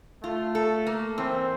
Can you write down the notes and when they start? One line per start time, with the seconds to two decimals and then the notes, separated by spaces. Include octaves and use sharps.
0.23 A3 F4
0.55 A4
0.87 A#3
1.18 E3 C4